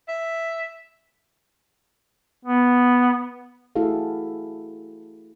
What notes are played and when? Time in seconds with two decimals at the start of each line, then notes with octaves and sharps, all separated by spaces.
0.08 E5
2.45 B3
3.75 A3 E4 F#4 G#4 A4 F5